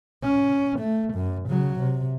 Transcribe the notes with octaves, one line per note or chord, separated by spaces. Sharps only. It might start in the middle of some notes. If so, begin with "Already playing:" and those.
C#4
A3
F#2
C#3 F#3
C3